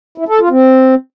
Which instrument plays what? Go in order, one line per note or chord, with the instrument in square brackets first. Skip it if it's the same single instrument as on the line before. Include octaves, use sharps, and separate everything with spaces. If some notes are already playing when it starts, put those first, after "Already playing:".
[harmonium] E4
A4
F4
C4